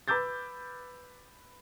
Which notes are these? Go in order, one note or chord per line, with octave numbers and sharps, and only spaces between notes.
B4 B5 D6 E6 G6 A6